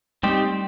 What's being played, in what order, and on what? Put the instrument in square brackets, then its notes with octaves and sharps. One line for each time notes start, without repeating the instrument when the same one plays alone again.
[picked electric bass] G3 A3 [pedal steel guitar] C4 D#4 G4 C5